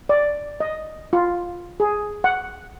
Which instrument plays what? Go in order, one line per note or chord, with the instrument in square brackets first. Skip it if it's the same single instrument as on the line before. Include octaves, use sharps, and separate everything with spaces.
[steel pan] D5
D#5
F4
G#4
F#5